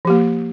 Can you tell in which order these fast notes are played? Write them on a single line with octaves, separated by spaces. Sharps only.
F3 G4 A#3